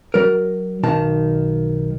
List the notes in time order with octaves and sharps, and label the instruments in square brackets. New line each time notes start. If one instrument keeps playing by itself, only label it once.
[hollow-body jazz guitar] F#3 A#4
B1 D#3 A5